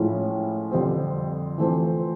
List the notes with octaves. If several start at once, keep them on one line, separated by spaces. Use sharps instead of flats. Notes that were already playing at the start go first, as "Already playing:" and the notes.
Already playing: A2 F3 G#3 C#4 E4
F2 D3 G3 C4
E3 A3 C4 F4